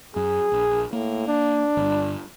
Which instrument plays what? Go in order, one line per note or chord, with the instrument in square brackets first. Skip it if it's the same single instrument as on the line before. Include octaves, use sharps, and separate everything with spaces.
[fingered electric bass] F#2 [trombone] G#4
[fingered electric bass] A#1
[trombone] A2 [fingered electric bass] A#3
[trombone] D4
[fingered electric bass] G1 G2